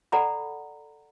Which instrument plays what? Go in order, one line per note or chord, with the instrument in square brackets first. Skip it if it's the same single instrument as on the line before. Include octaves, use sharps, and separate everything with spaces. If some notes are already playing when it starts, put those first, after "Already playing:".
[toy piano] A4 D5 F#5 A#5 B5